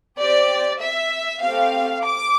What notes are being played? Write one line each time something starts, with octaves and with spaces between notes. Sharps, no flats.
C4 G4 D5
E5
A3 C4 G4 F5
D6